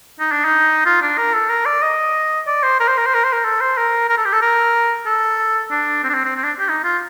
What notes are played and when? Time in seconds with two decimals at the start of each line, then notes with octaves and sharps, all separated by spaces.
0.20 D#4
0.32 D4
0.45 D#4
0.86 F4
1.02 D4
1.18 A#4
1.34 A4
1.50 A#4
1.66 D5
1.82 D#5
2.47 D5
2.63 C5
2.80 A#4
2.88 C5
2.98 A#4
3.06 C5
3.15 A#4
3.24 C5
3.33 A#4
3.45 A4
3.61 C5
3.77 A#4
4.09 A#4
4.18 A4
4.25 G4
4.33 A4
4.42 A#4
5.06 A4
5.71 D4
6.04 C4
6.10 D4
6.14 C4
6.25 C4
6.36 C4
6.44 D4
6.60 G4
6.69 D#4
6.84 F4